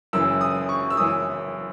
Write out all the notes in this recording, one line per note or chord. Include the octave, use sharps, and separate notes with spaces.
F#1 F#2 E3 E6
D#6
C#6
E6
F#1 F#2 E3 D#6